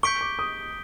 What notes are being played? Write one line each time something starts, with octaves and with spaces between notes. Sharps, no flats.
C#6 G6 B6 D7 G7
D6
D#6